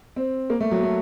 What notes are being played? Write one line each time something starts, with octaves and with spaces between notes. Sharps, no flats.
C4
A#3
A3
F#3
A3